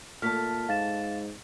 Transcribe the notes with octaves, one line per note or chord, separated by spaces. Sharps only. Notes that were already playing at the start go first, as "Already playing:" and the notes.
A#2 A3 A5 F6 B6
G#2 F5 A6 E7